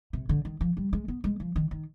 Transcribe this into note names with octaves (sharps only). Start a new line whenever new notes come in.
C3
D3
D#3
F3
G3
G#3
B3
G#3
F3
D#3
D#3